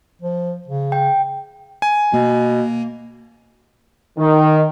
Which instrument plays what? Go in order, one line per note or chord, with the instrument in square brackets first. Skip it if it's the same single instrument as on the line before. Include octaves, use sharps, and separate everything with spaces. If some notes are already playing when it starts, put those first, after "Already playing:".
[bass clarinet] F3
C#3
[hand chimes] G5
[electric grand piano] G#5
[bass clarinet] B2 [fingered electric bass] A#3
[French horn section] D#3